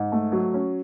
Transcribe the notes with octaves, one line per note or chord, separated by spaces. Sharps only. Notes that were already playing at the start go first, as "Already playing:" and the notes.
Already playing: G#2
A3
F#3
C#4